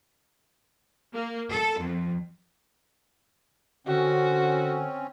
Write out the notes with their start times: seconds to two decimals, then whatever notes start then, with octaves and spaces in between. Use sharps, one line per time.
1.14 A#3
1.51 A4
1.81 F2
3.87 D3 C4 C#4 F#4